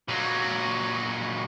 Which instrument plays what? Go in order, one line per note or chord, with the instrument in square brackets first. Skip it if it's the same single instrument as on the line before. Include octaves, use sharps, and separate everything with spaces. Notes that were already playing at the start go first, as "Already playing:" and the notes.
[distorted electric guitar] A#2 F#3